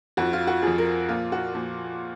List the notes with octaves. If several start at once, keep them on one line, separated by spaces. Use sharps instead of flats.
F2 F3 F#4
F4
F#4
F2 F3 G#4
A#4
A#2 F3 F4
F#4
A#2 F3